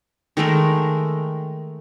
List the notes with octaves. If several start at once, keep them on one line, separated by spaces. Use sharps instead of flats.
D#3 G#3 A3 A#4